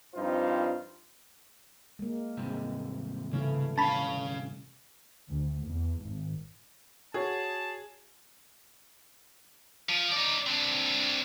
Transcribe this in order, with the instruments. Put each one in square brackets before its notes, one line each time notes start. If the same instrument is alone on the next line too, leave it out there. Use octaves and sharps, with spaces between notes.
[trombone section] G2 F3 C4 D#4 F4 C5
[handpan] G#3 A#3
[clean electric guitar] C2 G#2 C3 [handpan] G#3
[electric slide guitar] C#3 [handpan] E3 A3 E4
[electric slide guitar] C#4 F5 [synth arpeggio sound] A5 B5
[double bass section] D2
E2
G#1
[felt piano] F#4 C#5 [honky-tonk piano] G#4 [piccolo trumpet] A5
[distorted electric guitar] F3
D#4 D5
C4 D4